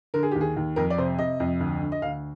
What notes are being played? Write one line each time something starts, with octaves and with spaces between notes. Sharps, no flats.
D3 A#4
G#4
G4
D#2
G#4
D#2
F2 A#4
D5
C3 C5
C3 D#5
F2
D2
D3
D#5
D2 F5